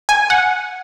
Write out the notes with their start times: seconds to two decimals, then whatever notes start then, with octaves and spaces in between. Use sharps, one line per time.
0.09 G#5
0.30 F#5